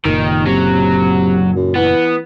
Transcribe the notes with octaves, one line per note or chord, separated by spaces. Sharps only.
F#1 A#2 D#3
C3 F#3
F#2
E3 B3